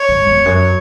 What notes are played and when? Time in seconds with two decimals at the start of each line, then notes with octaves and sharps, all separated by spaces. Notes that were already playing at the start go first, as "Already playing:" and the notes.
Already playing: C#5
0.09 G#2
0.27 E2
0.46 F#2